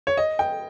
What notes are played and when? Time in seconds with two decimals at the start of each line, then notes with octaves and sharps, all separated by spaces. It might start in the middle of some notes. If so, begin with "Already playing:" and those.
0.07 C#5
0.17 D#5
0.39 G5